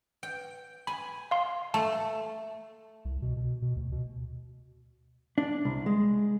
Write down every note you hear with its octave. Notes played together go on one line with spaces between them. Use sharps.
G5
G#5 B5
F5 C6
A3 A5
C2
B2
B2
B2
D2
B2
D4
C2
G#3